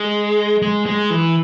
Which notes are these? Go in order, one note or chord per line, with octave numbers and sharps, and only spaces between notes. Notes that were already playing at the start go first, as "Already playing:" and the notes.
Already playing: G#3
G#3
G#3
E3